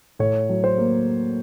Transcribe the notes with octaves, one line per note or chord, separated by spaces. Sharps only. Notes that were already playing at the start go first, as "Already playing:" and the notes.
A2 C#5
F#3
C5
A#3